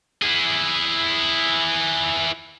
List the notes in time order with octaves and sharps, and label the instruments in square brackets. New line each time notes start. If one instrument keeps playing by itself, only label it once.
[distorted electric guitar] E4 G#4